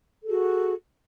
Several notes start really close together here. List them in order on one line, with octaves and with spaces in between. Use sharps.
A4 G#4 F#4